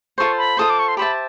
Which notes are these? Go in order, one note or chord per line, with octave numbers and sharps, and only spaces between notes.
F4 A4 C5 C#6
B5
F4 A4 C5 D#6
D6
C#6
C6
G4 C5 E5 A5 B5